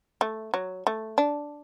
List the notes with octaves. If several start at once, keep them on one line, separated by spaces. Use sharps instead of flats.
A3
F#3
A3
D4